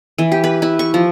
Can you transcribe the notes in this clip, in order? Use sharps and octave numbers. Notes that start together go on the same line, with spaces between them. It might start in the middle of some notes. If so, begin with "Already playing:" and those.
E3
G4
B4
E4
C#6
F3